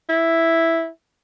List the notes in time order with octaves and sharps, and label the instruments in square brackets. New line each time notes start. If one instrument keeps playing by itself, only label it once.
[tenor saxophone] E4